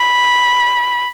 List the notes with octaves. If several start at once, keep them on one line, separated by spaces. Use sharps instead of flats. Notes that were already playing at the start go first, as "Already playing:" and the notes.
Already playing: B5